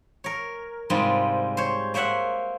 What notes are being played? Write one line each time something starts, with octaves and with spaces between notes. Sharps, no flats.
A#4 C#5
G#2 C3 G3 F4
C5 C#5
A#3 C5 C#5 E5 F#5